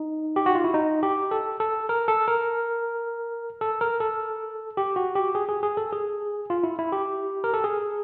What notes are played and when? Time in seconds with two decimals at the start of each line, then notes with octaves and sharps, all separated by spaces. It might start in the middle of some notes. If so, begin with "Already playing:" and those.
Already playing: D#4
0.36 G4
0.46 F#4
0.55 F4
0.64 E4
0.74 D#4
1.03 G4
1.31 A4
1.60 A4
1.89 A#4
2.08 A4
2.28 A#4
3.61 A4
3.81 A#4
4.00 A4
4.77 G4
4.96 F#4
5.15 G4
5.35 G#4
5.49 G#4
5.63 G#4
5.77 A4
5.93 G#4
6.50 F4
6.64 E4
6.79 E4
6.92 G4
7.44 A#4
7.54 A4
7.64 G#4